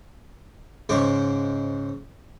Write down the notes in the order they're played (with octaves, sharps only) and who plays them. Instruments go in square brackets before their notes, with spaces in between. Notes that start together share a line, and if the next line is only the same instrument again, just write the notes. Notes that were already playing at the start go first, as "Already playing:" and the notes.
[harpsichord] G#2 C#3 C5 C#6 D6